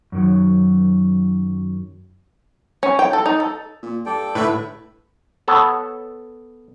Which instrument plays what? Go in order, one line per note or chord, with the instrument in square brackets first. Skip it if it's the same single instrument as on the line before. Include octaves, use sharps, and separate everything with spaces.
[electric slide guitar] F#2 D#3 F#3
[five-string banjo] C#4
G5
A4
D#4
A4
[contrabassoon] A#2
[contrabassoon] G2 [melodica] A4 D5 G5
[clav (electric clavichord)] A2 [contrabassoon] D3 [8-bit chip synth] B4 E5
[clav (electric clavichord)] B3 A4 C#5